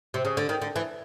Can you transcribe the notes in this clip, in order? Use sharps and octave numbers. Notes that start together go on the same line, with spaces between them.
C3
C#3
D3
D#3
D3
E3